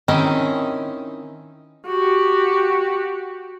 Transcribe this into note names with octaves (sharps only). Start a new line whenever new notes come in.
D#3 C4 C#4 D#4 E4 D#5
F#4 G4